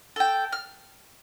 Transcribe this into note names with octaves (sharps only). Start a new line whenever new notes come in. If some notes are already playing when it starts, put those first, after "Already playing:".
A4 G5
F6